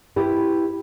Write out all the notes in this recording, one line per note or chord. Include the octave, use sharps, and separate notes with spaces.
E4 G4 B4